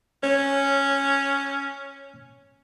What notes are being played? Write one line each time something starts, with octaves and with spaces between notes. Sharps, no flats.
C#4 C#5